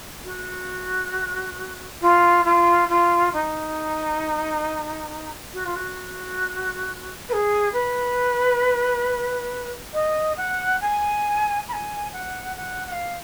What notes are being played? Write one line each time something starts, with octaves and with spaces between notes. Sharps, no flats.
F#4
F4
F4
F4
D#4
F#4
F4
F#4
B4
G#4
B4
D#5
F#5
G#5
B5
G#5
F#5
F#5
F#5
F5